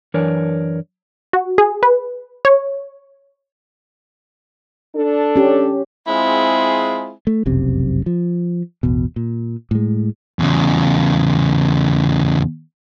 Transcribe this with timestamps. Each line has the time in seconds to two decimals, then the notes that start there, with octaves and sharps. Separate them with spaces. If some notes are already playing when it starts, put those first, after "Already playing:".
0.14 F#2 E3 D4 A#4 C#5 D5
1.33 F#4
1.58 G#4
1.83 B4
2.45 C#5
4.95 D4 A4
5.36 C#4 G4
6.07 G#3 C4 E4 F4 G#4
7.27 A3
7.46 F1 B1 F#2 C3
8.06 F3
8.83 A1 E2 B2
9.16 A#2
9.71 A2 G#3
10.39 E2 C#3